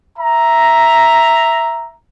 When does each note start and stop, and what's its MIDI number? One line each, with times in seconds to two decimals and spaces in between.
0.19 1.96 76
0.19 1.96 82